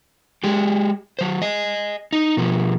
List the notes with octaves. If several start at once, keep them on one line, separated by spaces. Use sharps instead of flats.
G#3 G4
F#3 C5
D#5 G#5
D#4
B2 F3